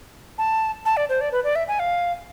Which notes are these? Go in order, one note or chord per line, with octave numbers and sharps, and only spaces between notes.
A5
A5
D5
C5
D5
B4
D5
E5
G#5
F5